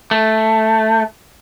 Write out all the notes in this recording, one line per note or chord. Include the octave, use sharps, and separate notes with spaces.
A3